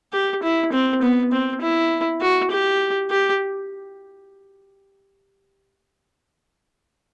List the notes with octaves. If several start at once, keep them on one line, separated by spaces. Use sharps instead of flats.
G4
E4
C4
B3
C4
E4
F#4
G4
G4